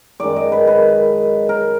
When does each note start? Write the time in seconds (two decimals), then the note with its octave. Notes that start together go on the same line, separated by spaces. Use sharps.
0.20 F#2 D#3 G#3 D5
0.36 D#5
0.52 B4
0.67 B4
1.49 A#4